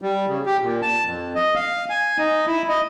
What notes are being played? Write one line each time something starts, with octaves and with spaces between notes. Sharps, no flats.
G3
C#3
G4
A#2
A5
F2
D#5
F5
G#5
D#4
E4
D#5